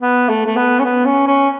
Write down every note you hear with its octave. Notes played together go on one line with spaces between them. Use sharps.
B3
A3
A3
B3
C#4
B3
C#4
C#4